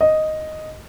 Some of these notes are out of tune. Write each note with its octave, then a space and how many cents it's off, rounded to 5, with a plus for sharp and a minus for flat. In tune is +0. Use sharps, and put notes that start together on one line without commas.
D#5 +0